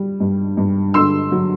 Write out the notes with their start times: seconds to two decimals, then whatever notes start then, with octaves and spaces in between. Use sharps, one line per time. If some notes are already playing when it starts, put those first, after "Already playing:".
Already playing: G3
0.20 G2
0.57 G2
0.94 D3 C6 E6
1.32 F#3